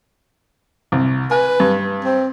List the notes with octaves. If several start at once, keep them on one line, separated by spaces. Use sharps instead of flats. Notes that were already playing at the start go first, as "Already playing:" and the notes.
C2
B4 G#5
G2
C4